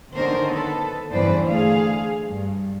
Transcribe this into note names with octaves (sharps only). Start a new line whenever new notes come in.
D3 D#3 C#4 D#4 A#4 C5
B3 A4 B4
E2 G2 C#3 B4 C5 D5
D3 A3 G#4 F5
G2